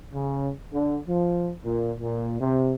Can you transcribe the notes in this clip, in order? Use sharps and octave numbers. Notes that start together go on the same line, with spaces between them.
C#3
D3
F3
A#2
A#2
C3